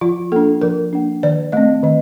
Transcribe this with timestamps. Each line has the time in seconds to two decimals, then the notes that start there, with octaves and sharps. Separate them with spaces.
0.01 F3 F4
0.32 A#3 D4 A4
0.62 F3 A#4
0.93 A#3 D4
1.23 D#3 D5
1.52 A3 C4 D#5
1.83 D#3 D#5